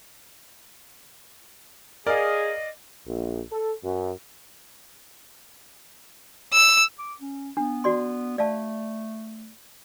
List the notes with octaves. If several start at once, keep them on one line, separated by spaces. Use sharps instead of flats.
G#4 A#4 D5 D#5 F5
A#1
A4
F#2
E6
D6
C#4
B3 D4
F#4 D5 C6
A3 D5 F5 A5